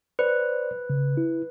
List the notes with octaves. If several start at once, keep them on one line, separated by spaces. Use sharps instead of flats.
B4 C5 D5
C#3
E4